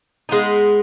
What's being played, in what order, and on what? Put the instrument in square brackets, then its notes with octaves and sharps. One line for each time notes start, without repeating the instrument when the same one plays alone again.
[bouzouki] G#3 B3 D#4